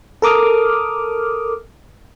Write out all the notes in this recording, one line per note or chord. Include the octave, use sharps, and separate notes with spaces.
A4 A#4 D6 D#6 F6